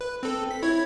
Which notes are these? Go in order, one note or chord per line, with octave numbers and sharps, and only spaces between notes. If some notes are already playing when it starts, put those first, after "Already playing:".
B4
C4 A4
B6
E4 C#5 G#6